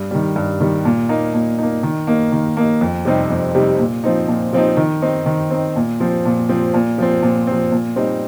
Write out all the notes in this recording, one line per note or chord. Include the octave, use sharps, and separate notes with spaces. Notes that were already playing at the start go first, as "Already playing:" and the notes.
Already playing: G2
D#3 G3
G2
D#3 G3
A#2
A#3 D#4
A#2
A#3 D#4
D#3
A#3 D#4
D#3
A#3 D#4
F2
C3 G3 C4 D#4
F2
C3 G3 C4 D#4
A#2
F3 C4 D#4
A#2
F3 C4 D#4
D#3
C4 D#4
D#3
C4 D#4
A#2
F3 C4
A#2
F3 C4
A#2
F3 C4
A#2
F3 C4
A#2
G3 C4 D#4